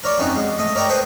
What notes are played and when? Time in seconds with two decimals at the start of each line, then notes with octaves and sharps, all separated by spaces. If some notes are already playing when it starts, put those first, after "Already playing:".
0.04 A#4 C#5 D5
0.18 F2 C#4 D#4 F#4
0.35 G#3
0.58 A3 D#5
0.75 A#4 C#5 D5 G5 A#5
0.89 A4 B4 C5 D#5 G5